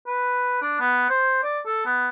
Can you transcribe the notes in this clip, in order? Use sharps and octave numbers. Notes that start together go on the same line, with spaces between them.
B4
D4
B3
C5
D5
A4
B3